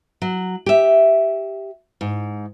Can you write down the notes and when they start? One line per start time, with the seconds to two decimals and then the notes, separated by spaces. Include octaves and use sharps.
0.22 F#3
0.66 G4 E5
2.01 G#2